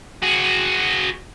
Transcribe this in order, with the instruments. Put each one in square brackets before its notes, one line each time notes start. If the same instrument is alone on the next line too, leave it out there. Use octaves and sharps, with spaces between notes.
[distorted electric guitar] F#4 G#4